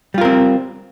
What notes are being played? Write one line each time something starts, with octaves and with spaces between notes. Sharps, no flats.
G3 C4 F4 A#4